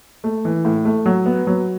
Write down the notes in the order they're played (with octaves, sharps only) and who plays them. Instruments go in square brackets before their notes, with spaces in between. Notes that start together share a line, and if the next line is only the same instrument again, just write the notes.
[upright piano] A3
E3
A2
A3
F#3
B3
F#3